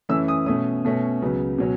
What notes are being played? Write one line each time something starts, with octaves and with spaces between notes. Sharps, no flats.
F#2 E3 A3 C#4 E6
D#6
B2 A3 C#4 D#6
B2 A3 C#4
C#2 C#3 F#3 B3
B2 F#3 C#4